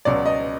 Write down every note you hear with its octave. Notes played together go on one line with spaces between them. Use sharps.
C#2 B2 F#3 D5
D#5